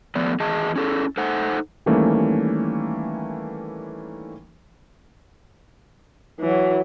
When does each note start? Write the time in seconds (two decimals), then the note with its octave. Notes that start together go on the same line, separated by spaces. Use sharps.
0.15 F3 A3 B3 D5
0.40 E2 G#4 D#5 A5
0.76 C#4 E4 G#4 A4
1.17 D#4 A4 C5 F#5
1.86 D#3 E3 G3 A3 A#3 C#4
6.40 E3 F#3